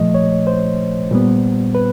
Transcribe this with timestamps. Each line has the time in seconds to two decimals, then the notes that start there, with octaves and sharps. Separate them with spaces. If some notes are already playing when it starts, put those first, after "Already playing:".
Already playing: A#2 F3 A3 D#5
0.14 C#5
0.47 C5
1.11 A#2 G3 B3
1.75 B4